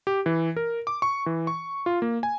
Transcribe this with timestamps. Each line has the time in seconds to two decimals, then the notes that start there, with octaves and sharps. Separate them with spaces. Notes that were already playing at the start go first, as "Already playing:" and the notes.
0.07 G4
0.26 E3
0.56 A#4
0.87 D6
1.02 C#6
1.26 E3
1.47 C#6
1.86 F4
2.02 A#3
2.23 G#5